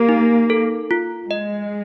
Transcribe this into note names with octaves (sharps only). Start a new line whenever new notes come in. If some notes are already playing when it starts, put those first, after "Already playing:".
Already playing: A#3 G4
D#4
A4
F4
G#3 D#5